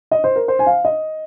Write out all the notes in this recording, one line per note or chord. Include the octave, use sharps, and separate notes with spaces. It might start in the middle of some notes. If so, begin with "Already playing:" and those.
D#5
C5
A#4
C5
G#5
F5
D#5